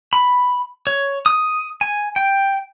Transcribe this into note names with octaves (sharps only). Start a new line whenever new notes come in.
B5
C#5
D#6
G#5
G5